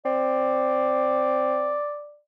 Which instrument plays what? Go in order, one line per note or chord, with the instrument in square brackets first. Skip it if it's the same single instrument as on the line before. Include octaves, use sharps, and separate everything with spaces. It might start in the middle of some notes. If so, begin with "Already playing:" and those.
[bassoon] C4 [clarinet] D5